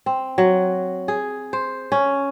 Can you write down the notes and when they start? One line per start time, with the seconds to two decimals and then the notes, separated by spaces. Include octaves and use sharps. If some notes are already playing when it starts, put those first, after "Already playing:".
0.06 C4
0.38 F#3
1.08 G#4
1.53 C5
1.92 C#4